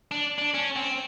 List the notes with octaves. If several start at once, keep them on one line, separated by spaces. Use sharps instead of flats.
D4
D4
C#4
C4